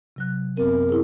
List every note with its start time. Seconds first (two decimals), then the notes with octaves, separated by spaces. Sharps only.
0.16 C3 F#3 F#6
0.57 F#2 B3 C4 A#4
0.89 E4 G#4